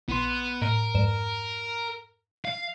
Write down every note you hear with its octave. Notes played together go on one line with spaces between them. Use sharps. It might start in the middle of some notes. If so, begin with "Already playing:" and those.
A#1 B3 C6
A2 A#4
F2 G#2 E7
F5